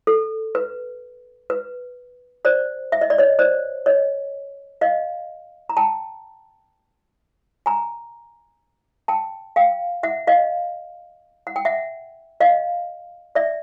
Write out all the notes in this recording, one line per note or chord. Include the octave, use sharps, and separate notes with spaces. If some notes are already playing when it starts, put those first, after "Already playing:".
A4
B4
B4
C5 D5
E5
D#5
D5
C#5 D#5
C5 D5
C#5 D#5
D#5 F5
A#5
G5 A5
G#5 A#5
G5 A5
F5 G5
E5 F#5
D#5 F5
F#5
G5
E5 F#5
D#5 F5
D5 E5